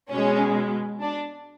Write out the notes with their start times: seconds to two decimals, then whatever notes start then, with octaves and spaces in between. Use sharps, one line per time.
0.10 B2 G#3 C#4
1.02 D4